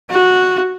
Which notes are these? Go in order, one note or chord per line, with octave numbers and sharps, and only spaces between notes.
F#4